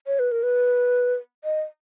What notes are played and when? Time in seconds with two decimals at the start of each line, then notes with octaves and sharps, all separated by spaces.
0.07 C#5
0.19 B4
0.32 A#4
0.43 B4
1.44 D#5